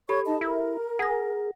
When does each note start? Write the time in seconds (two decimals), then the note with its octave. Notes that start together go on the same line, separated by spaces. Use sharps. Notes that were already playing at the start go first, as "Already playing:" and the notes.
0.09 G4 A4 C#5 B5 C#6 G#6
0.25 D#4 D#5 A5
0.41 E4 A#4
0.99 G#4 F#5 A#6